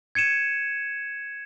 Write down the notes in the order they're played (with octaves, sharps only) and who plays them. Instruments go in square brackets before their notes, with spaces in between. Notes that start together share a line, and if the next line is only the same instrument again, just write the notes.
[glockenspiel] G#6 C#7 D#7 E7